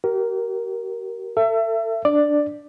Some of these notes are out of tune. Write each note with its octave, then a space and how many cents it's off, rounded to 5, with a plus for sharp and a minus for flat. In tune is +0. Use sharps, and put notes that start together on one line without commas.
G4 -40 A#4 +0
A4 +35 E5 +25
D4 +0 D5 +10